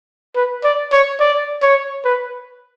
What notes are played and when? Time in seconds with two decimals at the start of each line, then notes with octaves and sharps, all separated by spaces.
0.36 B4
0.64 D5
0.92 C#5
1.20 D5
1.62 C#5
2.05 B4